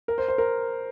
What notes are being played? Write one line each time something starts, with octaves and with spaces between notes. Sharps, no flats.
A#4
C5
C5
A#4